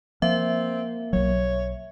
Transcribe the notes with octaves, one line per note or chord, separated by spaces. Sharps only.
F3 A#3 C4 E5
B1 F#3 C#5